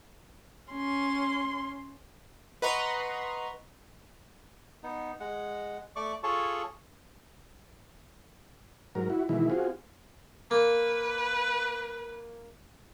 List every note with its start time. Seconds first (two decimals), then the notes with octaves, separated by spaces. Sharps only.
0.71 C#4 C6
2.62 B4 D#5 F#5 A#5 C6 C#6
4.83 B3 D#4
5.20 G#3 F#5
5.96 A3 D5 C#6 D6
6.23 F4 G#4 A4 C#5 A5 C#6
8.95 G#2 F#3 A#4
9.10 E4 F#4
9.29 B2 D#3 E3 G#3 E4
9.50 C4 F4 F#4 G#4
10.51 A#3 B4